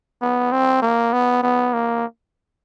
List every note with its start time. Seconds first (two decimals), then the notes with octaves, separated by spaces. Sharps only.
0.22 B3
0.52 C4
0.82 A#3
1.13 B3
1.43 B3
1.74 A#3